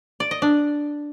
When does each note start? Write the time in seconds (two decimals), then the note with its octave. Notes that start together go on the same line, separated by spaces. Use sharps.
0.20 D5
0.31 D#5
0.42 D4